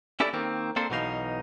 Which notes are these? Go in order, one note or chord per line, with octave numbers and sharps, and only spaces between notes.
C#4 E4 G4 A4 D5
D#3 A#3 C4
A#3 C4 D4 A4 C5
B1 B2 E3 D#4 F5